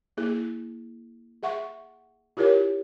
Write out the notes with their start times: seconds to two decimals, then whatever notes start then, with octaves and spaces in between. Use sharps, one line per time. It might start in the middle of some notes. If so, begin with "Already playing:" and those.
0.17 A#3 E4 G#4
1.43 G#4 E5 F#5 C#6
2.37 E4 F4 G4 A#4 C#5